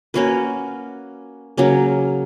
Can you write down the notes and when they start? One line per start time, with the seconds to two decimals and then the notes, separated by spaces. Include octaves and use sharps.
0.14 A#3 C#4 F#4 B4
1.57 C#3 F#3 A#3 C#4